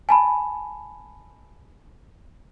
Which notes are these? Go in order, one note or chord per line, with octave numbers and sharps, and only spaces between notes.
G#5 A5 B5